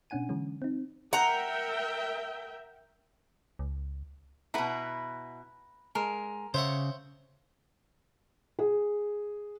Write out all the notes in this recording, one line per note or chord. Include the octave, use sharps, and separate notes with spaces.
B2 C#4 D4 F#5 G#5 D#7
D3 E3 F#3 G#3 C#4
C4 D#4
A#4 E5 F#5 G5 A#5
C#2
B2 E4 B4 F#5 A#5
G#3 A#4
C#3 C5 C#5 E5 F#5
G#4